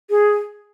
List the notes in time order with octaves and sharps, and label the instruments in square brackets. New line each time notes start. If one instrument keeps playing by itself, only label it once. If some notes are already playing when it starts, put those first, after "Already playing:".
[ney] G#4